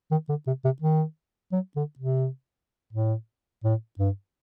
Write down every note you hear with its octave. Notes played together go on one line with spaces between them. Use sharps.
D#3
D3
C3
C3
D#3
F#3
D3
C3
A2
A2
G2